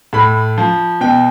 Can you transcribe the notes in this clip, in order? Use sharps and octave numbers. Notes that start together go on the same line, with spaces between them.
A2 B5
F3
B2 G5